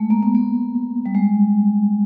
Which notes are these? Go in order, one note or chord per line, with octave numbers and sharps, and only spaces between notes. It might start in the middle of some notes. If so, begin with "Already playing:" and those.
Already playing: G#3 A3
A#3
B3
A#3
G3
G#3